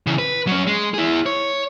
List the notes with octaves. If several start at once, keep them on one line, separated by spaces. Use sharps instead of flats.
C#3 E3
B4
F#3 C#4
G#3
E4 G#4
C#5